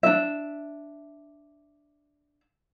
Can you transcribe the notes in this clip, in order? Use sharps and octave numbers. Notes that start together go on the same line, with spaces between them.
D4 E5